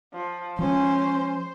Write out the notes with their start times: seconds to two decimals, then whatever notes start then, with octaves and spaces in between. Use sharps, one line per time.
0.14 F3
0.59 F3 G#3 C#4 C5